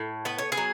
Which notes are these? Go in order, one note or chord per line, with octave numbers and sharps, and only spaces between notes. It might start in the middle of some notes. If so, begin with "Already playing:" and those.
Already playing: A2
B3 B4
C#5
G#4 B4
F#3